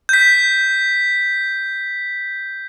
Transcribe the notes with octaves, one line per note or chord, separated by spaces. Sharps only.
G6 B6